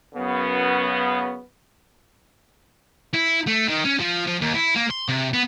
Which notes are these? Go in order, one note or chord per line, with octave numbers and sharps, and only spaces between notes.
F#2 C#3 B3
E4
A3
D#3
C#4
F3
F3
D#2
E4
A#3
C6
C3
B3